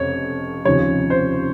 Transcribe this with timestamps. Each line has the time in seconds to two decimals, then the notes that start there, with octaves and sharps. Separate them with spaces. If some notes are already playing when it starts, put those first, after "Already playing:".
Already playing: F1 F2 C#3 C#5
0.65 F1 D#2 C#3 F3 C#5
1.10 C5